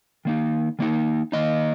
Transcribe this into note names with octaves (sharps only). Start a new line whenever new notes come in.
D#3 A#3 D#4
D#3 A#3 D#4
D#3 A#3 D#4 D#5